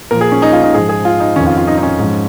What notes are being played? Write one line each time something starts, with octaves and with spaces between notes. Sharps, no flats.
A#2 F3 A#4
G#4
C#4
D#4
F4
D#4
G#2 F3 G#4
G#4
F4
D#4
F2 D#3 C#4
F4
F4
D#4
D#4
C#4
G#2 F3